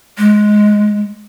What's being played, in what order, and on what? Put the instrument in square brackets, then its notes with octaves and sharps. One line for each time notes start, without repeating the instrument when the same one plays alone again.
[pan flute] G#3